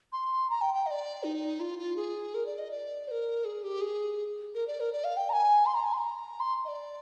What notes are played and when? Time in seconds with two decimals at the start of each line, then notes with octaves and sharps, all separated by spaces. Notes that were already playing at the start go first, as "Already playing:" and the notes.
0.12 C6
0.50 A#5
0.61 G5
0.74 G5
0.86 D#5
0.91 D5
1.24 D#4
1.60 F4
1.79 F4
1.96 G#4
2.34 A#4
2.46 D5
2.58 D#5
2.71 D5
3.08 C5
3.11 A#4
3.45 G#4
3.64 G4
3.81 G#4
4.55 A#4
4.67 D5
4.80 A#4
4.92 D5
5.04 F5
5.17 G5
5.29 A#5
5.33 G#5
5.66 C6
5.75 A#5
5.84 G#5
5.93 C6
5.98 A#5
6.40 C6
6.65 D#5
6.68 D5